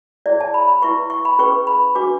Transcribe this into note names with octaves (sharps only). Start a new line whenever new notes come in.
E4 G#4 C#5 D5
A5
B5
B5
E4 B4 C#6
C#6
B5
C#4 G#4 B4 C#6
B5
D4 F#4 B4 D6